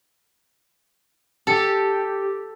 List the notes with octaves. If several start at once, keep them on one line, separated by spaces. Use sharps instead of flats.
G4 A4